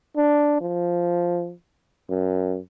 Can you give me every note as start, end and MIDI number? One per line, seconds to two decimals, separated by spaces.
0.17 0.58 62
0.61 1.53 53
2.10 2.59 42